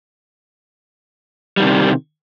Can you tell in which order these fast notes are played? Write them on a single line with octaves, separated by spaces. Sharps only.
G3 D#3 C3